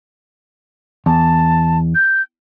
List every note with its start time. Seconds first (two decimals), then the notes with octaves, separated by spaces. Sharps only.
1.06 E2 A5
1.95 G6